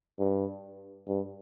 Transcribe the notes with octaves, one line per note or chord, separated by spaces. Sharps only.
G2
G2